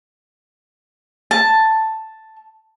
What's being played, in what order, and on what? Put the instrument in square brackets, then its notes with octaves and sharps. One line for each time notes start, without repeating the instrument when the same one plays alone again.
[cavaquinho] A5